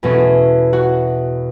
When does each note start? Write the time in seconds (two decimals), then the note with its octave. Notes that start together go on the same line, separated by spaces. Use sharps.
0.03 E2 B2 A3 C#4
0.73 F#4